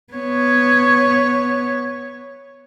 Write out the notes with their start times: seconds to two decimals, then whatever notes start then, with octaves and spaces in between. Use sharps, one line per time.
0.13 B3 C#5